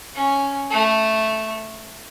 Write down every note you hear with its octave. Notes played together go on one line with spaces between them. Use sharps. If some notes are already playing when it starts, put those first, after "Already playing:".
C#4
A3